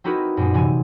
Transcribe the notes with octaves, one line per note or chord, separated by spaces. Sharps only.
C4 D#4 E4 F#4 A#4 B4
F#2 A#2 G#3
C3 E3 G#5